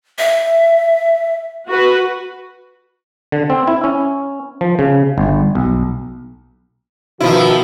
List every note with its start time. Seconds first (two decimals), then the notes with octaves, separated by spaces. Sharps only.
0.18 E5
1.67 F#4 B4
3.32 D3
3.50 C4
3.67 E4
3.84 C#4
4.61 F3
4.79 C#3
5.18 G1
5.55 B1
7.21 B2 D#3 F3 E4 F#4